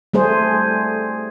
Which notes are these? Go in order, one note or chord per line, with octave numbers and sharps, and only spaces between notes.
G3 A3 G#4 C5